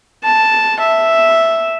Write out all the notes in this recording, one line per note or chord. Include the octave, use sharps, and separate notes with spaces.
A5
E5